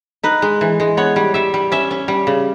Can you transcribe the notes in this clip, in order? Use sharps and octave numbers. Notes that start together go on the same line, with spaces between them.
D#4 B4
G#3
E3
G#3
B3 C#5
G3
G3 E5
G3
C#4 E5
C#4
G3
C#3